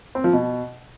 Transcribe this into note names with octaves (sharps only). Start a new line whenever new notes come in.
C4
F3
B2